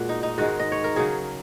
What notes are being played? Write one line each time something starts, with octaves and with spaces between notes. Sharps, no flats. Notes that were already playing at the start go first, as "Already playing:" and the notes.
Already playing: A#2 G#3 F#4
D#4
D#4
G#2 D#3 G#3 F#4
D#5
C#5
A#4
C#3 F#3 G#4